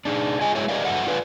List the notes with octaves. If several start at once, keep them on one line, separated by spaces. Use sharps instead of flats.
D4 D#4 G#4
F4 G#4 D#5 G#5
F#3 G#3 E4 G#4 C#5 E5
G4 A#4 D5 D#5 F5
G2 F#3 A4 E5 F#5
F4 A4 B4 D5 F5